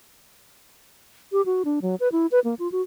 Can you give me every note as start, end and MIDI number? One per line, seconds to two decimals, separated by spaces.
1.32 1.44 67
1.46 1.63 66
1.65 1.79 62
1.82 1.95 54
2.00 2.09 71
2.12 2.27 64
2.32 2.40 71
2.44 2.55 58
2.59 2.70 65
2.72 2.82 66